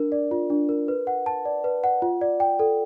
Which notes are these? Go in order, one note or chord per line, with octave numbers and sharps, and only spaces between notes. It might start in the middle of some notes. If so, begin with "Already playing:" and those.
Already playing: D4 A#4
D5
F4
D4
A#4
B4
F#5
A5
D5
B4
F#5
F4
D5
G5
A4